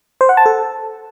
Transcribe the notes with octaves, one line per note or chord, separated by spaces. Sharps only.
C5
F#5
A5
A4